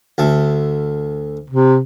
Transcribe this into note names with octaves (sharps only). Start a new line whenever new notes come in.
D2 A3
C3